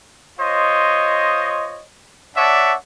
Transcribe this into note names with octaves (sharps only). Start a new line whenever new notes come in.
F4 C5 C#5 D#5
D4 C#5 D5 E5 F#5 A5